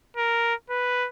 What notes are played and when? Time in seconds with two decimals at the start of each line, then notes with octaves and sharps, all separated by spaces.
0.17 A#4
0.70 B4